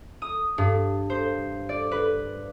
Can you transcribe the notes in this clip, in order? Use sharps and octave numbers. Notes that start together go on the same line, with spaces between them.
D#6
G2
C5
D5
B4